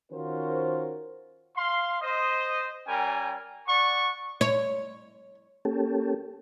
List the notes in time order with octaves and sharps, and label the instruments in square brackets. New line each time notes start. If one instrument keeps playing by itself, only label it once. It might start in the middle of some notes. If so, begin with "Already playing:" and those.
[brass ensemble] D#3 C#4 F4 F#4 A#4 C5
[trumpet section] F5 C6
C5 D#5
G3 C#4 A#4 G5 G#5
D5 F#5 C#6
[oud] C#5
[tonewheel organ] A#3 C#4 G4 A4